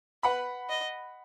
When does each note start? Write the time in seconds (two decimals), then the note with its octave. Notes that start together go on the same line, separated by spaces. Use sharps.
0.23 B4 F#5 B5
0.70 D#5